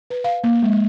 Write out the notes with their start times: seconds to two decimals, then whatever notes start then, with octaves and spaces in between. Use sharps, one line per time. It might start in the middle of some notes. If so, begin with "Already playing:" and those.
0.10 B4
0.24 F5
0.44 A#3
0.63 G#3